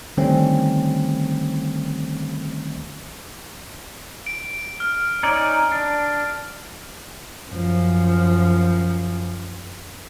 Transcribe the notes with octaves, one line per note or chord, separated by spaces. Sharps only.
D3 D#3 G3 A3 C4 C#4
D7
F6
C#4 D#4 D5
D4
F#2 F3